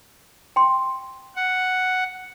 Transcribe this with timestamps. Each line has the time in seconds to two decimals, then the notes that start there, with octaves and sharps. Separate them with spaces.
0.56 G5 C6
1.36 F#5